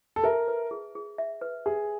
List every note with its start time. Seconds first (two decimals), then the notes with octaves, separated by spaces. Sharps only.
0.16 A4
0.24 A#4 E5
0.48 B4
0.71 G#4
0.95 G#4
1.18 E5
1.41 B4
1.66 G#4 E5